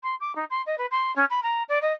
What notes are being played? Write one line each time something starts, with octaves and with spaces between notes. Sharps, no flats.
C6
D6
D#4
C6
D#5
B4
C6
C#4
B5
A#5
D5
D#5